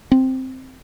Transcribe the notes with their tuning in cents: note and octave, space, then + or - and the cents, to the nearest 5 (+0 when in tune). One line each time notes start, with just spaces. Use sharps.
C4 +0